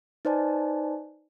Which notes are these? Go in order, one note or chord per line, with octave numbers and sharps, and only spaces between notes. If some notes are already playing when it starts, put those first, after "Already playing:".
D#4 B4 C5 D5 G#5 A5